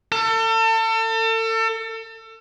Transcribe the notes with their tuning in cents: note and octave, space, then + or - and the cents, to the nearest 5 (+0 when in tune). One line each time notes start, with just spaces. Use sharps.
A4 +35